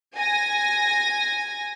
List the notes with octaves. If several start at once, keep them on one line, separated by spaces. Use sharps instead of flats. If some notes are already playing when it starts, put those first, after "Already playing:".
G#5 A#6